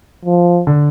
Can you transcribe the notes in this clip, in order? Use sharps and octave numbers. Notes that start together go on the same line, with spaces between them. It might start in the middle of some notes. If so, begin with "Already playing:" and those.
F3
D3